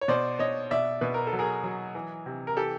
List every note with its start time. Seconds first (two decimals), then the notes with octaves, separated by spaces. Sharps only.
0.01 C#5
0.08 B2 C5 D5
0.39 B2 C#5 D#5
0.71 B2 D5 E5
1.01 B2 B4
1.14 A#4
1.27 A4
1.33 F#3
1.39 G#4 A#4
1.63 F#3
1.95 E3
2.26 C3
2.47 A#4
2.56 E3 G4 A4